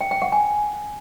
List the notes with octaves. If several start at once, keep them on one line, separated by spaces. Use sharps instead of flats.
G5
G5
F#5
G#5